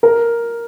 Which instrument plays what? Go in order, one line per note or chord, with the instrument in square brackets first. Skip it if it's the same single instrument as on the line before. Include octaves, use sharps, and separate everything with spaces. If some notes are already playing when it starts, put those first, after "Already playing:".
[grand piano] A#4